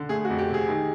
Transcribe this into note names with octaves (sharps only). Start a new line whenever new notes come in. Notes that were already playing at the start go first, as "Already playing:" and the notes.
Already playing: D3
A3 G#4
F#4
F2
G4
C3
G#4
D#3